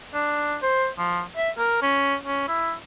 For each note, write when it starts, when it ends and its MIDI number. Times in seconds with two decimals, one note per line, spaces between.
0.14 0.56 62
0.62 0.88 72
0.98 1.21 53
1.37 1.50 76
1.58 1.79 70
1.82 2.15 61
2.25 2.46 61
2.48 2.73 64